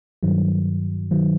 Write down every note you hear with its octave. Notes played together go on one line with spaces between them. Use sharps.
G2 D#3 F#3
D#3 F#3